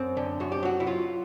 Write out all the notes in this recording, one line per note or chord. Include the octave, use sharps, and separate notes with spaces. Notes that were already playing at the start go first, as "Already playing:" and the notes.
Already playing: F#2 C4
D3
F#2 F#4
G4
F#3 F#4
E4
F#3 F4